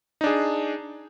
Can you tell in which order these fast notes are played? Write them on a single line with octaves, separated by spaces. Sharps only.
D#4 D4 G#4